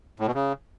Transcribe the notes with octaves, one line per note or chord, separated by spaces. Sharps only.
A2
B2
C#3